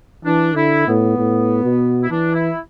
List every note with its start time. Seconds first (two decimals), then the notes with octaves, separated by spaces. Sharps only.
0.25 E3 D4
0.55 D3 E4
0.87 A2 B3
1.18 A2
1.64 B2
2.02 E4
2.10 E3 D4
2.34 E4